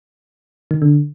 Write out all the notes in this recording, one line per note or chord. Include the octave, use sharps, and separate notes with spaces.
D#3
D3